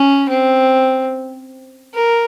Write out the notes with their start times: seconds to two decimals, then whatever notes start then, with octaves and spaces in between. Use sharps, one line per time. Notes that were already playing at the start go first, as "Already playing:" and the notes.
Already playing: C#4
0.29 C4
1.94 A#4